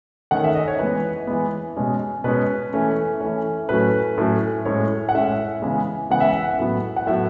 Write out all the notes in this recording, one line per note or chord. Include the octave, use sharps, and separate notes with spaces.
D#3 A3 C#4 F#5
E5
D#5
C#5
E3 G#3 B3 B4
E3 G#3 B3
B2 G#3 C#4
B2 G#3 C#4 B4
E3 A3 C#4
E3 A3 C#4
A2 F#3 A3 C#4 B4
A2 F#3 A3 C#4
A2 G#3 C#4 C#5
F#5
A2 G#3 C#4 E5
C#3 E3 G#3 B3
C#3 E3 G#3 B3 F#5
E5
F#5
A2 F#3 B3
F#5
A2 F#3 B3 E5